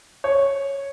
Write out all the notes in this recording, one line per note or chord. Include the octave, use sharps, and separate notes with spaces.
C#5